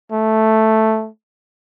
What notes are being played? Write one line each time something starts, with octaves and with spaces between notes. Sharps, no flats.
A3